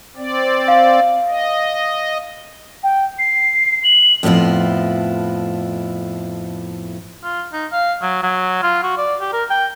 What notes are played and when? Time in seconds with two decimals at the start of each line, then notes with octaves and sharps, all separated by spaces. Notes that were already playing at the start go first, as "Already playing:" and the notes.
0.17 C4 D5
0.68 F5
1.28 D#5
2.83 G5
3.19 C7
3.84 F#7
4.23 F2 A2 B3 E4 F4
7.23 F4
7.53 D#4
7.72 F5
8.02 F#3
8.23 F#3
8.62 F4
8.83 F#4
8.97 D5
9.21 G4
9.32 A#4
9.50 G5